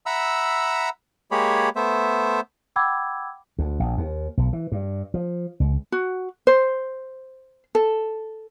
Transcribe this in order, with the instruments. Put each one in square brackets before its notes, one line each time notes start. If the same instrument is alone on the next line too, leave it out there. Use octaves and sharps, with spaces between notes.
[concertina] E5 F#5 A#5 B5 E6
G#3 A#3 G4 G#4 C#5 B5
A3 B3 C5 E5
[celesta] F#5 G5 B5 D6 E6 G#6
[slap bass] D2
A#1
D#2
B1
E3
G2
F3
C#2
[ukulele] F#4
C5
A4